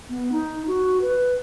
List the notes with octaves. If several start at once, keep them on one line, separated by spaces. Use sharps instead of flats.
B3
D#4
F#4
B4